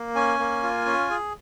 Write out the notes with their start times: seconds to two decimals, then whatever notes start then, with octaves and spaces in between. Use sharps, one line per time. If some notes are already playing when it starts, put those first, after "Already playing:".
Already playing: A#3
0.15 C#4 G#5
0.39 A#3
0.63 F4
0.86 C#4
1.10 G#4